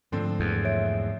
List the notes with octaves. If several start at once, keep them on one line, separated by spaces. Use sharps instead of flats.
G#2 D3 F3 A3 C4
E2
C#5 E5 D7